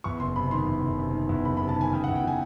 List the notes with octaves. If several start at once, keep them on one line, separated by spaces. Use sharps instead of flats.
E2 C#6
F#1 C6
C3 B5
D#3 C6
E2
F#1
C3
D#3
E2
F#1 B5
B5
C3
A5
D#3 G#5
C#3 G5
F#5
E2
G5
E3 G#5